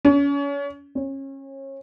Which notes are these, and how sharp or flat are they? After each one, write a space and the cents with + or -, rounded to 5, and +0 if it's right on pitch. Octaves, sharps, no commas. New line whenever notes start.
C#4 +35
C#4 -30